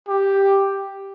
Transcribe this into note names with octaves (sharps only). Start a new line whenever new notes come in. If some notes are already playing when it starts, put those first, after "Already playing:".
G4